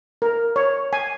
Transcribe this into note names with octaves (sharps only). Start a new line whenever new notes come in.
A#4
C#5
G#5